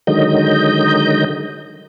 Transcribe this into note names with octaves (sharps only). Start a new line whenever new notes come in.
D3 D#3 F#3 G#3 D#5 G6